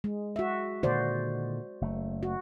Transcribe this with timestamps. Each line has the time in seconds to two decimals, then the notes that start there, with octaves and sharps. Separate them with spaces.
0.04 G#3
0.36 F#4 E5
0.83 A#2 D3 D#3 F#4 C5 D5
1.81 F#1 A3
2.23 F#4